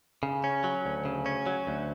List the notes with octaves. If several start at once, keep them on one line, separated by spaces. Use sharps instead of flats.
C#3
C#4
F#3
D2
C#3
C#4
F#3
D2